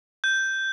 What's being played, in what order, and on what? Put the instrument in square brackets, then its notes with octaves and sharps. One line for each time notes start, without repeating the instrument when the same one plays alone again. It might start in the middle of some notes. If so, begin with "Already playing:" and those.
[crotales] G6